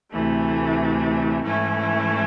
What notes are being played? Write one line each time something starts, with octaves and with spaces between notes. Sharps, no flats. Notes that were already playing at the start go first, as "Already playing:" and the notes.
D2 C3 E3 A3
G#2 E3 A3 C#4 E4